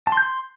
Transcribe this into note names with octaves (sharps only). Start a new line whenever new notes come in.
A5
C6
G6
C6